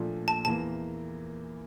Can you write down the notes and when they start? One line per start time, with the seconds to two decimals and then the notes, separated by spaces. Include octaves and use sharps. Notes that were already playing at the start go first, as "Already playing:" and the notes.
Already playing: A#2 F3 A3 D4 A4
0.28 A5
0.45 E2 E3 A#3 A5